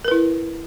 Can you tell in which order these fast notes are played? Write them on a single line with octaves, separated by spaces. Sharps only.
A#4 B4 E4